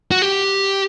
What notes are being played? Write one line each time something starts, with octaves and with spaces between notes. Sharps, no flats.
F#4
G4